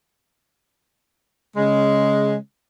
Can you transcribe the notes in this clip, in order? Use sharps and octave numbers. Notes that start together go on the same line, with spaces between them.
C#3 G#3